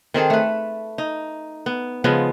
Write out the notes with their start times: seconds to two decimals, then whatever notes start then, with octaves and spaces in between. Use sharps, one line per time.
0.14 D#3 C4 G#4 A4
0.30 A3 B4
0.98 D#4
1.66 B3
2.04 C#3 F3 G#3 B3